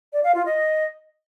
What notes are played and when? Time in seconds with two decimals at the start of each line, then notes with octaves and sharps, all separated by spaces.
0.13 D5
0.24 F5
0.35 F4
0.46 D#5